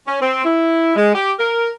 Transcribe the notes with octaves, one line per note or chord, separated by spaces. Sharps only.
C#4
C4
E4
G#3
G4
A#4